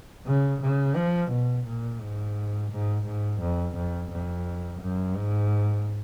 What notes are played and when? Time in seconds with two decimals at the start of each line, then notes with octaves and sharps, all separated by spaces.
0.26 C#3
0.62 C#3
0.96 F3
1.31 B2
1.67 A#2
2.01 G#2
2.71 G#2
3.06 G#2
3.41 F2
3.76 F2
4.12 F2
4.82 F#2
5.16 G#2